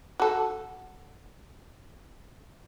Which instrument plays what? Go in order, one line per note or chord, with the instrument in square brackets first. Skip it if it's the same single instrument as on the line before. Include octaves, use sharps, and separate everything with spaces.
[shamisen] F#4 A4